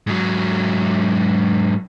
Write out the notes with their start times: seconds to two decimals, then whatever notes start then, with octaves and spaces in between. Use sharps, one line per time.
0.07 G#2 F#3